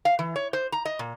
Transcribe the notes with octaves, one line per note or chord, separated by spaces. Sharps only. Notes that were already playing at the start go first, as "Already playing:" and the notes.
F5
E3
C#5
C5
A#5
D#5
A#2